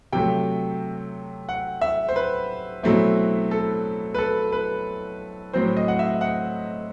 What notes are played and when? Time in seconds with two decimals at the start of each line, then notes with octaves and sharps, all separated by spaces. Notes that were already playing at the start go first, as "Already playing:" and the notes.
0.13 C3 F#3 A3 G5
1.49 F#5
1.81 E5
2.09 C5
2.16 B4
2.83 B2 F#3 A3 C4 E4
3.51 A4
4.14 B4
4.19 A4
4.52 B4
5.53 A2 F#3 C4 C5
5.77 D#5
5.88 F#5
5.99 E5
6.21 F#5